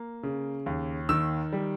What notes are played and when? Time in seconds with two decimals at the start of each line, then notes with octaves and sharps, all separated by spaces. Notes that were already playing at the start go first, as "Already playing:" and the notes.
Already playing: A#3
0.23 C#3
0.66 D#2
1.09 D#3 E6
1.53 G3